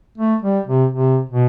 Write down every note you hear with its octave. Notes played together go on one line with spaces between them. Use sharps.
A3
G3
C3
C3
B2